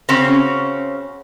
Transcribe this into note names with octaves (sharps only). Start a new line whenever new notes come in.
C#3 C4 C#4 F#4